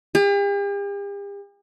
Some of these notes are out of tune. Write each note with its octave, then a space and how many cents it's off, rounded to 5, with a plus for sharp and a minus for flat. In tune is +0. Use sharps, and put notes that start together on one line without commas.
G4 +45